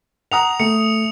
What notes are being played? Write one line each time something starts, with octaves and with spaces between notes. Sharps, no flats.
F#5 A#5 D#6 F7
A3 C#7